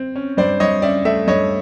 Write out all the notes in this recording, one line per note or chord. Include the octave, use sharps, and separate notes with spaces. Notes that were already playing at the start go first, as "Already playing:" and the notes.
Already playing: C4
C#4
G2 C5 D5
G2 C#5 D#5
C#4 D5 E5
A3 D5 E5
G2 C#5 D#5